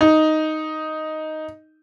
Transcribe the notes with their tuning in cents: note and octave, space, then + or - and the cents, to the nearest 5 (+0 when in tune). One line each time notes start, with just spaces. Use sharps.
D#4 +0